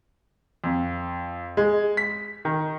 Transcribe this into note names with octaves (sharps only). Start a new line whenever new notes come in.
F2
G#3
B6
D#3